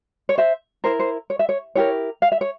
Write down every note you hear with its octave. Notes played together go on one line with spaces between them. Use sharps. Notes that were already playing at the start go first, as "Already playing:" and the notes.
C#5
C5 E5
E4 A#4 C5
C5
C#5
E5
C#5
E4 G4 A#4 C#5
F5
E5
C#5